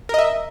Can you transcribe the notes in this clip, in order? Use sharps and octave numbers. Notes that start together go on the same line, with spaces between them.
A#4 D#5 E5